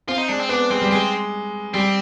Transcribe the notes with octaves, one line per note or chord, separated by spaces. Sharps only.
C4 F4
D#4
G#3 D4
C4
B3 D4
G#3 C4
G3
G#3 C4
G3 C4